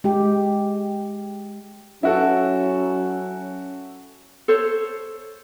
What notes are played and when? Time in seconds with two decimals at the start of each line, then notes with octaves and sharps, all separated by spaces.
0.04 G#3 G4
2.03 F#3 C#4 E4 F#4 A4
4.48 A4 C5 C#5